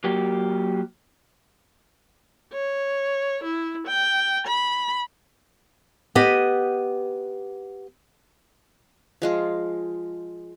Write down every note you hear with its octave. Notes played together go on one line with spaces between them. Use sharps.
F#3 A#3 G4
C#5
E4
G5
B5
B3 G4 D#5
F3 G#3 F4